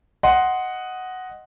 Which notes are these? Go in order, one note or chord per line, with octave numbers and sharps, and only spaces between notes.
D#5 F#5 C6